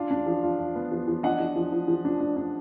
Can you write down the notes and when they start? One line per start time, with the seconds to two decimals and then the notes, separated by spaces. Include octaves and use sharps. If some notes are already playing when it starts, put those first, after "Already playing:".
Already playing: D4 F4 F5
0.11 D4
0.26 F3
0.43 F4
0.59 F4
0.75 B3
0.92 F3
1.08 F3
1.23 D4 D#5 F#5
1.40 F3
1.56 F3
1.72 F3
1.88 F3
2.05 D4
2.20 D4
2.36 D4